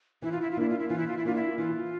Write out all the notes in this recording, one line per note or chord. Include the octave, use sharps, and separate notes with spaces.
E3 E4
F4
E4
F4
A#3 D4 E4
F4
E4
E3 F4
E4
F4
E4
A#3 D4 F4
E4
E3 F4